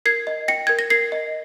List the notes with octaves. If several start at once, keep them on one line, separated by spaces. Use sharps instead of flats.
A#4 G#6 C7
D#5
G5 A#6 C#7
A#4 G#6
A#6
A#4 G#6 C7
D#5